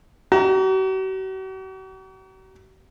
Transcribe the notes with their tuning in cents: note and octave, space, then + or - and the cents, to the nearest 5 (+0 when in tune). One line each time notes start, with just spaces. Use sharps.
F#4 +45 A#5 +0